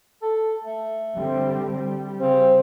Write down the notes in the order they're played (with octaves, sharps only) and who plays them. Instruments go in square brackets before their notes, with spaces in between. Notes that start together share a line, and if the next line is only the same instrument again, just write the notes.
[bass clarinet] A4
A3
[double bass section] D3 G3 C4
G3
[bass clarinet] C#3 [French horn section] C4 C5